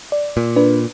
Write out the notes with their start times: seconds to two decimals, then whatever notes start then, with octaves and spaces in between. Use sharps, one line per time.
0.12 D5
0.37 A#2
0.56 D4 B4